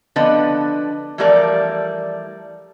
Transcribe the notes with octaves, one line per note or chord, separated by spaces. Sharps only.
D3 F3 B3 D4 B4 D#5
E3 F3 G3 A3 A#4 D5